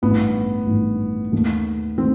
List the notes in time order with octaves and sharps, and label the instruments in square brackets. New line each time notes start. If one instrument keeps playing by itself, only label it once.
[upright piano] A1 G2 D#3 [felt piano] B3
[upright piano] A1 G2 D#3
D#2 D#3 A3
[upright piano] D#3 A3 [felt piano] C4